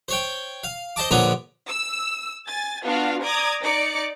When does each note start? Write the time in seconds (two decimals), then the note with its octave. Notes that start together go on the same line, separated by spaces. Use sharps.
0.08 C5 C#5 G5
0.64 F5
0.96 C5 D#5 A5 D6
1.11 A#1 D3 B3 C#5 A#5 D6
1.69 E6
2.48 G#5 A6
2.84 B3 D4 F4 F#4 F5
3.24 D5 A#5 D6 D#6 G#6
3.63 D#4 D5 D6 C#7